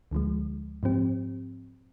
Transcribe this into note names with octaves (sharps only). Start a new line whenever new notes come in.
D2 D3 F3 G#3
G#2 F3 C4 G4